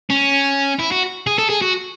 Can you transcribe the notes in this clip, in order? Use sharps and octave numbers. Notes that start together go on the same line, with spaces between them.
C#4
E4
F#4
G#4
A4
G#4
F#4